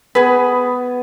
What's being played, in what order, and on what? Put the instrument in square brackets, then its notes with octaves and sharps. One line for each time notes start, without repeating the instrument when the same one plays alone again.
[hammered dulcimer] B3 [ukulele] G#4 B4